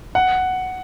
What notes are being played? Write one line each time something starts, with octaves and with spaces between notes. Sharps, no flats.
F#5